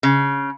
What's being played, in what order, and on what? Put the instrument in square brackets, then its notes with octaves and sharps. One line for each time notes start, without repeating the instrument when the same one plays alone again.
[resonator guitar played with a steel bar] C#3